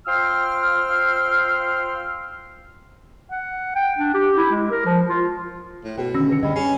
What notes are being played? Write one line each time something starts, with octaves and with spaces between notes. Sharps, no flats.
F4 C5 G5 C6 E6 F6
F#5
G5
D4
G4
E4
G#3
A#4
F3
F4
A2
B2 G#4 G5
D3 D#3 C#4 E6 A#6
G#4 B4 C#7
D#2 D3 G3 D#5 B5
C#4 G#4 C7